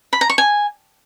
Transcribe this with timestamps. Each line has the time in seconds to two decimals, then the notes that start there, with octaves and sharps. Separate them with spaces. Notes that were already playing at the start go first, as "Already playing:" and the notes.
0.13 B5
0.21 A#5
0.30 C#6
0.38 G#5